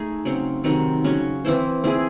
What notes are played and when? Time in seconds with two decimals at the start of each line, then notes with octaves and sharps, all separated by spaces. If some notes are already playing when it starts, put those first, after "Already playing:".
Already playing: A3 D#4 G#4
0.25 C#3 F#3 C4
0.64 C3 D#3 F#3 C4
1.04 C#3 F#3 C#4 F#4
1.45 E3 C4 E4 C5
1.84 C4 E4 G#4